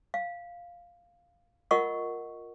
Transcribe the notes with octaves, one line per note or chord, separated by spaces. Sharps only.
F5
F4 A#4 D#5 F#5 C#6 E6